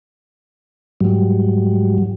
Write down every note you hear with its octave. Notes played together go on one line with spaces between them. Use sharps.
G#2 F#3 G3